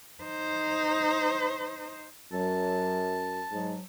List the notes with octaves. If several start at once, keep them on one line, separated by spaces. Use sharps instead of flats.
D#4 C5
F#2 F#3 A5
G#2 F#3